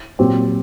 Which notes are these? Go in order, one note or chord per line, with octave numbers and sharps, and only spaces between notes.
A#2 F#3 C4 G4